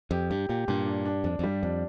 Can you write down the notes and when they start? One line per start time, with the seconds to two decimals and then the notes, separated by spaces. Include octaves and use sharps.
0.11 F2 G4
0.30 G2 G4
0.49 A#2 G4
0.68 G2 A#2
0.86 D4
1.06 D4
1.24 F2 D4
1.39 F2
1.43 G2 G3
1.62 F2 D4